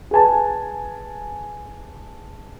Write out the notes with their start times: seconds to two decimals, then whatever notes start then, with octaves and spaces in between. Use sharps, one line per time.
0.11 G#4 B4 G#5 A5